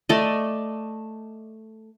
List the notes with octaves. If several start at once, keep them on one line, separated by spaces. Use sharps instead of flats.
A3 D5 D#5